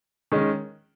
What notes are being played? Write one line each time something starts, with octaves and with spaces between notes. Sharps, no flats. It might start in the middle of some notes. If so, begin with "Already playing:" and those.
D#3 G#3 C#4